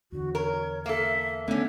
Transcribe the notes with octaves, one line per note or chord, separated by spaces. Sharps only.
E2 D3 F#4
A#4 C#5
A#3 A4 E5
D3 A3 B3 C#4 E5